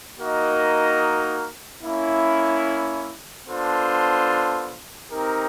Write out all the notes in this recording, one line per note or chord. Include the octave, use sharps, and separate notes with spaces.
A#3 D#4 F#4 A#4 D#5
A#3 C#4 E4
B3 D4 F4 A4 C5
C4 D#4 G4 A#4